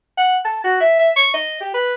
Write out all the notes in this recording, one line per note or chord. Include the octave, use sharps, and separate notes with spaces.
F#5
A5
F#4
E5
E5
C#6
D#5
G4
B4